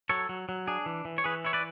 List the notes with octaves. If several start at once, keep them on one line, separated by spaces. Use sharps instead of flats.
F#3 A4 C#5
F#3
F#3
D4 G#4
E3
E3
C#5
E3 G#4 B4
E4 C#5
B4 D5